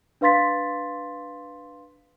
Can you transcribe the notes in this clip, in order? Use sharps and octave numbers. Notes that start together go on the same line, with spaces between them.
D4 B4 F5 C6 A6 B6